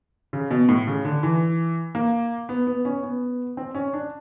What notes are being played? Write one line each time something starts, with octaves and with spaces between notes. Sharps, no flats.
C#3
B2
A2
C#3
D3
E3
A#3
B3
B3
C#4
B3
C4
C#4
D4